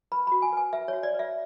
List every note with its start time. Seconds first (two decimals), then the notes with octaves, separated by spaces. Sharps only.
0.12 B4 B5
0.27 B5
0.32 F#4
0.42 G#5
0.52 B4 G#5
0.73 B4 E5
0.88 C#5
0.93 F#4
1.03 D5
1.14 B4
1.19 E5